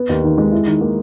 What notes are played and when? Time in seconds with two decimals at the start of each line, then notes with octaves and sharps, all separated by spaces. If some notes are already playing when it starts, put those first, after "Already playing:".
Already playing: B3
0.09 D#2
0.24 D#3
0.38 G#3
0.52 E4
0.67 D#3
0.81 A#3